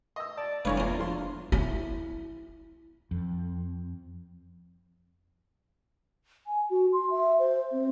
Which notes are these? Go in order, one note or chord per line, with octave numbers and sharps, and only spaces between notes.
D#5 E6
D5 A5
F1 G2 D3 E3 B4 C#5 F5 A#5
E2 A#3 C#4 D4 F4 A#4
F3 D4 F4 C6
E4
F2
G#5
F#4
C6
E5
C5
C4